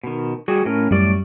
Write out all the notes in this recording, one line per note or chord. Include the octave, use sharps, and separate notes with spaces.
B2 D#3
G3 F#4 G#4
A2 C#4 A#4
F#2 A2 G3 D5 C#6